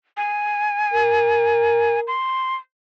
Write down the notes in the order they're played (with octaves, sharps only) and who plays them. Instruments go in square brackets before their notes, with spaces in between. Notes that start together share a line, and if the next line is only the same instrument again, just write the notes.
[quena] G#5
[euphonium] A#4
[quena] C6